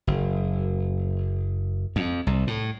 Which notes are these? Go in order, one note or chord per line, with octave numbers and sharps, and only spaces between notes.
F#1
F2
C2
A2